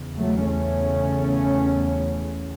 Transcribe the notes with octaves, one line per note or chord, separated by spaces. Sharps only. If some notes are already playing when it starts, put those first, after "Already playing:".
Already playing: E2 C#3
F#3 A3
A3 C#4